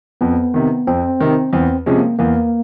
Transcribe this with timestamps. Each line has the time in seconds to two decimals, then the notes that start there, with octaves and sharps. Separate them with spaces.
0.21 F2 B3
0.54 C3 D#3
0.87 F2 C4
1.20 C3 D#3
1.53 E2 C4
1.86 C3 F3 G#3 C#4
1.97 A#3
2.19 E2 A#3